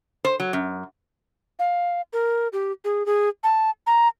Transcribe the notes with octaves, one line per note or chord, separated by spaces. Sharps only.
C5
F#3
F#2
F5
A#4
G4
G#4
G#4
A5
A#5